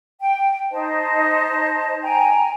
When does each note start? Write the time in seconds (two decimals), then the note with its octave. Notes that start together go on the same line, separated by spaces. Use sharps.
0.21 G5
0.72 D#4 C5 D#5 A5
2.02 G5 G#5 A#5